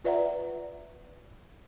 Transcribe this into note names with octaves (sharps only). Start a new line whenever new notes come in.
F4 B4 D5 E5 F#5 A#5